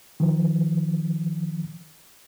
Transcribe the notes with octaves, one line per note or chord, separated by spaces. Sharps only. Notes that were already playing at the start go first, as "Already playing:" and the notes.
D#3 F3